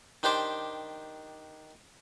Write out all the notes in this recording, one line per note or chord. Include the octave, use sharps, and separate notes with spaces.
D#3 D4 G4 C5 D6